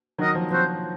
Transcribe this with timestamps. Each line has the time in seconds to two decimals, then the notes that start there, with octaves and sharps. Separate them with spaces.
0.19 D#3 F#3 F#4 A#4 D#5
0.35 F3
0.51 F3 C4 F#4 C5